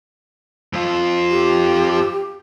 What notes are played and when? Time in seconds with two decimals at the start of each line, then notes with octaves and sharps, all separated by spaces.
0.73 F2 F4
1.31 G4